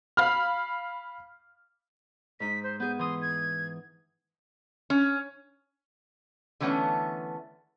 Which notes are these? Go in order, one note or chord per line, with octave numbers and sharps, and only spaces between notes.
F5 B5 F6
G#2 D#4 B6
C5
B3 G#4 G6
E3 C6 D#6
G#6
C#4
D3 E3 A3 B3 C#4